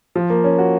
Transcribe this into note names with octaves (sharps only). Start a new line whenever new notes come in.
F3
A#3
C#4
F#4